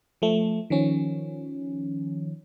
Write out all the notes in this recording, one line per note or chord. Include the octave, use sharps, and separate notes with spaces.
F3 A3
D#3 F3 C#4